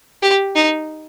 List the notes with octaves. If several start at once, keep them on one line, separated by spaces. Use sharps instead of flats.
G4
D#4